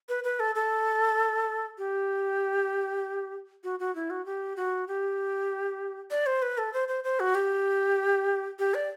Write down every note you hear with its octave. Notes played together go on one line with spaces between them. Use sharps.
B4
B4
A4
A4
G4
F#4
F#4
E4
F#4
G4
F#4
G4
D5
C5
B4
A4
C5
C5
C5
F#4
G4
G4
D5